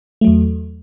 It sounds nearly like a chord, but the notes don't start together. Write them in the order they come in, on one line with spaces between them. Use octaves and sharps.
A3 F#3 E2